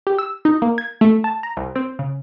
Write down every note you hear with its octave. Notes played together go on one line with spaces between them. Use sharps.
G4
E6
D#4
A#3
G#6
A3
A5
A#5
C2
C4
C#3